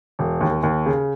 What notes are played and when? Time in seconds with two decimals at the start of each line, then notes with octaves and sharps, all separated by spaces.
0.19 E1
0.41 D#2
0.63 D#2
0.86 C#3